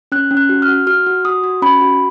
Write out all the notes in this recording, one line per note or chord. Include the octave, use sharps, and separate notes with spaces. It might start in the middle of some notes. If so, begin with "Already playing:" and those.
C#4 F#6
C#4
F#6
F#4
F6
F#4
F#4 F6
F#4
F#4 D#6
F#4
C#4 B5
F#4